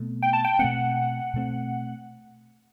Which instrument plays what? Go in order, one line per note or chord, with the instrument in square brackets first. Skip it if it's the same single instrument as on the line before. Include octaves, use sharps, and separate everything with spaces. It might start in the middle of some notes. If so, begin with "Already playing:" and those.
Already playing: [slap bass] B2 A3 C4
[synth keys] G5
A5
G5
[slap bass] B2 A3 C4 [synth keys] F#5
[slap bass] B2 A3 C4